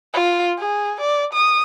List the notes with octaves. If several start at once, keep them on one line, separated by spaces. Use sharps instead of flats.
F4
G#4
D5
D#6